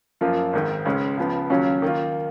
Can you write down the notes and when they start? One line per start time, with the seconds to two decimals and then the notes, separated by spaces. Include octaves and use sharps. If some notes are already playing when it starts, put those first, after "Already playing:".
0.21 F#2 F3 A#3 F4
0.53 G#1 G#2 D#3
0.85 C#2 C#3 G#3 C#4
1.17 C#2 C#3 F3 B3
1.50 D#2 C#3 F#3 C#4 F4
1.82 D#3 A#3 F4